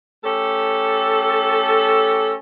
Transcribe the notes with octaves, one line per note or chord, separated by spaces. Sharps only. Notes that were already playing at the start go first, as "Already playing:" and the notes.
A3 C#4 G4 A4